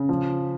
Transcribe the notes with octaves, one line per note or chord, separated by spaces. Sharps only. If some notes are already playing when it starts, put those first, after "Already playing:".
Already playing: C#3
F3